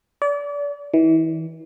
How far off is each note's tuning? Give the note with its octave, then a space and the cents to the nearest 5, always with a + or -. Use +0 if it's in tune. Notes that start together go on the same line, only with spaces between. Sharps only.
D5 -35
E3 -35